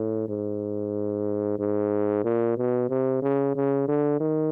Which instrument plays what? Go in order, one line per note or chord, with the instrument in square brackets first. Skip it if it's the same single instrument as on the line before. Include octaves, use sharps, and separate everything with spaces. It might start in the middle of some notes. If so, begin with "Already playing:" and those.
Already playing: [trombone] A2
G#2
G#2
A#2
B2
C3
C#3
C#3
D3
D#3